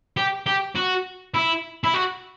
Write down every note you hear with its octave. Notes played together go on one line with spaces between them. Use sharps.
G4
G4
F#4
E4
E4
F#4